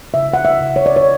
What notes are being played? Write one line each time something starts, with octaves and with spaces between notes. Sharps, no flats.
C#3 E5
F#5
E5
C#3
C#5
D5
C#5